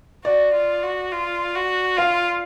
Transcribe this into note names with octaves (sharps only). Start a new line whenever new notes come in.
F#4 D5
F4
F#4
F4
F#4
F4 F5